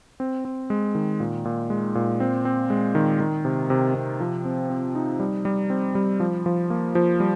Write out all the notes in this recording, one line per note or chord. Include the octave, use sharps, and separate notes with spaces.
C4
C4
G#3
D#3
A#2
A#2
G#3
A#2
C4
C4
G#3
D#3
D#3
C3
C3
C3
F3
C4
C4
D#4
G3
G3
C4
G3
F3
F3
A#3
F3
G3